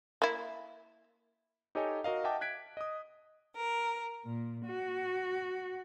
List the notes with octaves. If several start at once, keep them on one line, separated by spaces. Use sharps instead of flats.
A#3 E4
D#4 G4 A4 C#5 D#5 G#5
F#4 A#4 D#5 F5
D#5 E5 F#5 G5 A5 D6
F#6 G#6 B6 D7
D#5 D#6
A#4
A#2
F#4